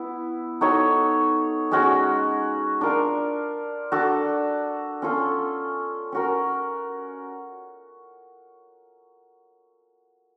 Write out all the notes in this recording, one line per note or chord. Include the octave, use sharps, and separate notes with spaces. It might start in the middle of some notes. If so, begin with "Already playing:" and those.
Already playing: B3 E4
D#4 F#4 A4 C#5
G#3 C#4 F#4
D4 F4 A#4
D4 F#4 A4
C#4 F4 A4
C#4 F#4 A#4